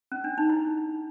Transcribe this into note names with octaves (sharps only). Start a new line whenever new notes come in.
C#4
D4
D#4
E4